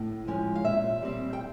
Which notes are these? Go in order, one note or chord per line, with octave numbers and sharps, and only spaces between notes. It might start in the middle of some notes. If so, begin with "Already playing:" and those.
Already playing: A2
F3 G#3 C#4
F5
A#2 E5
G3 C4
G5